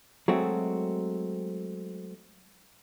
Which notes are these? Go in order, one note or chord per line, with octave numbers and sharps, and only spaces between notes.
F#3 G#3 A3 C4 F#4